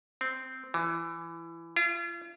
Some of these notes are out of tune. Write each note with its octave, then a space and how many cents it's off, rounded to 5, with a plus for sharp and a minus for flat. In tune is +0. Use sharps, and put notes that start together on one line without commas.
C4 -10
E3 +20
F4 -40